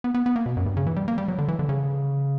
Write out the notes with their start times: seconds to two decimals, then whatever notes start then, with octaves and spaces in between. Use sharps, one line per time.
0.04 B3
0.14 B3
0.26 B3
0.36 A#3
0.46 B2
0.57 F#2
0.66 G2
0.77 C#3
0.87 E3
0.96 G3
1.08 A#3
1.18 G3
1.28 F#3
1.38 D3
1.48 E3
1.59 D3
1.69 C#3